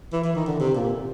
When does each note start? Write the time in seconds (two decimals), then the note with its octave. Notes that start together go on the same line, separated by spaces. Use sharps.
0.13 E3
0.24 E3
0.36 D#3
0.47 D3
0.60 C3
0.75 A#2